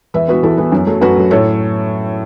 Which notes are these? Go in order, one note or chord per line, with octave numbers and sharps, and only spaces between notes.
E2 B4 E5
E3 B3 F#4 B4
E2 E4 A4
E3 B3
F#2
F#3 A3
F#2 F#4 B4
F#3 A3
A2 A4 C#5